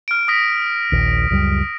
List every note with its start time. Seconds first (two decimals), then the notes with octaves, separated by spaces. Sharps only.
0.08 F6 D7
0.28 D#6 A#6 B6
0.92 A#1 D#2
1.31 C#2 F#2 G3